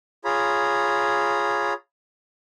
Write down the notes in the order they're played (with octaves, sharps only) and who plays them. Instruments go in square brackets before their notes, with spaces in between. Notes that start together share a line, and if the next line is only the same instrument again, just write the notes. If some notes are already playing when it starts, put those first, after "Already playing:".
[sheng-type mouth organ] F4 G#4 C#5 A#5 B5